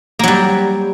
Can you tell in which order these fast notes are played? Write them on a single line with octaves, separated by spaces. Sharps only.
A#3 F#3 G3